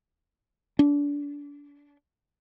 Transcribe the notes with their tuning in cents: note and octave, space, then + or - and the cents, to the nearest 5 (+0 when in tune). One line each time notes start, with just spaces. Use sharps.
D4 -30